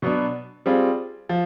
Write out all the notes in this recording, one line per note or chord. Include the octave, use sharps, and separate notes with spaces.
B2 F#3 B3 D4
G3 C4 F4 G#4
F3